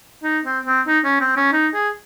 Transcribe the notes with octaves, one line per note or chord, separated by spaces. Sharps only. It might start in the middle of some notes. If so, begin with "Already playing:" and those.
D#4
C4
C4
D#4
C#4
C4
C#4
D#4
G#4